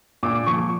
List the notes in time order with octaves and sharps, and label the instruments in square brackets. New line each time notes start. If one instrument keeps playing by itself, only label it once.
[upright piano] A#2 D6
F3 C#6